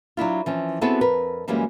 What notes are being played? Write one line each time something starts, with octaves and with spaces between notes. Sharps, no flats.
F#3 D4 E4 F4
E3 F3 C#4
B3 C4 E4 F#4 G#4 A4
F2 A#4 B4
F#2 E3 G3 G#3 A#3 C#4